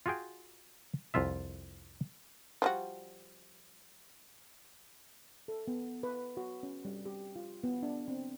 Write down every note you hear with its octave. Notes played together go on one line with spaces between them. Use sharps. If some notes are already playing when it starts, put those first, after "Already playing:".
F4 F#4 G#4 G5
C2 F2 F4 E5
F3 G3 F#4
A4
B3
B4
F#4
C#4
G3
G4
F4
B3
D4
C4